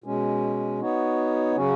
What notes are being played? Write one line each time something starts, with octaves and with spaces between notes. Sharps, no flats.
B2 G#3 C#4
B3 D#4 F#4 C#5
C#3 F#3 C#4 F#4